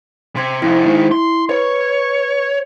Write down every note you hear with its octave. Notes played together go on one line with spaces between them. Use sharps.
C3 G5 C6 G#6
F2 C3 E4
G#2 D#3
C6
B4 C#5